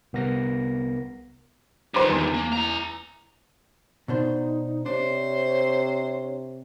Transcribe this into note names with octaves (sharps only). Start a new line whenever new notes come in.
C2 B3 A#4 A#6
G2 D#3 B4 C5 D6
E2
A#3
E4 A#5
B2 D4 D#4 C5
C3 D4 C5 C#5